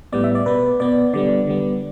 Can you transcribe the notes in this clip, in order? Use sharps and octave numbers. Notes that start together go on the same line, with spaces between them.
A2 G3 B3 D5
E5
D5
B2 B3 B4
B2 B3 D5
D3 G3 B3 D5
D3 G3 B3